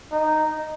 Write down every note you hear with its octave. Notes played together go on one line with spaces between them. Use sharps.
D#4